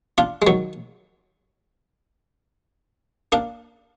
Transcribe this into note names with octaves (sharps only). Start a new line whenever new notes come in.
D4 F4
G#3
D#3 F#3
A#3 D4